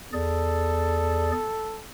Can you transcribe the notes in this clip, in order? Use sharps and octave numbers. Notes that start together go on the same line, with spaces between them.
E2 G#4 A4 D5